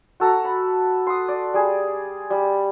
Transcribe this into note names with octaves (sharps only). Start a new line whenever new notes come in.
F#4 A4 A#5
B5
C6 D#6
D5
G3 G#4
G3